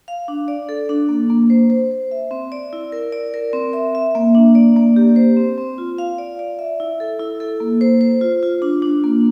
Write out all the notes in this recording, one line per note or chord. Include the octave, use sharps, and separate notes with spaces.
F5
D4
D5
A4
D4
A#3
A#3
C5
C5
C5
E5
C4
D5
E4
A#4
D5
A#4
C4
E5
E5
A#3
D4
D5
A#3
G4
C5
C4
C4
F4
F5
D5
D5
E5
E4
A4
E4
A4
A#3
C5
C5
F4
F4
D4
D4
A#3